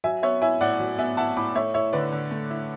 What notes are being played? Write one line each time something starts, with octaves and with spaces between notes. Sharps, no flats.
F#3 E5 G#5
B3 C#5 E5
E4 E5 G#5
A2 D5 F#5
F#3
B3 E5 G#5
E4 F#5 A5
A2 B5 D6
A3 C#5 E5
E4 C#5 E5
D3 B4 D5
D3
A3
E4